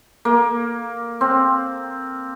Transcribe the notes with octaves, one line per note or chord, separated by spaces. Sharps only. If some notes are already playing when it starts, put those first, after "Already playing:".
A#3
C4